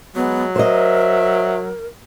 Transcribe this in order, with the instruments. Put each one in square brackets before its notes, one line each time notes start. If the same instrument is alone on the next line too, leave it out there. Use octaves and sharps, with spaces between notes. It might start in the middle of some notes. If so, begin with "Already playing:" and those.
[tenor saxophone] F#3 [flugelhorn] G#3 [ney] B3
[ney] A#4 [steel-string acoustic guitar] C5 D#5 [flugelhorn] E5